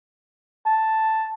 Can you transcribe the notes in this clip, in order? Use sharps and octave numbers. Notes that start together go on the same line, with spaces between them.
A5